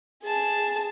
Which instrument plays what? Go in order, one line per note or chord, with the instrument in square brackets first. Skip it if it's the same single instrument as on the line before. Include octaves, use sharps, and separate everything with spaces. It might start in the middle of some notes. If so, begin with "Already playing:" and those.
[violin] G#4 A5